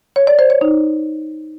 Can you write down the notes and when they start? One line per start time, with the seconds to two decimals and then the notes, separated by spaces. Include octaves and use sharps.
0.16 C#5
0.27 D5
0.39 C5
0.50 C#5
0.61 D#4